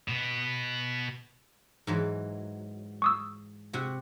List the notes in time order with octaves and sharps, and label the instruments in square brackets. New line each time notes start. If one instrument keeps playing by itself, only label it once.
[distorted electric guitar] B2 B3
[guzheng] G#2 E3 F#3
[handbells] C#6 D#6 E6
[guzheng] C3 F#4